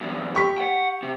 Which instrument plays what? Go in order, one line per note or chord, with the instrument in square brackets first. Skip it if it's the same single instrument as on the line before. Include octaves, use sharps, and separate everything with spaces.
[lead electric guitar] E2 G2
[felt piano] G4 C#6 B6
[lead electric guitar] F#5 G5
C3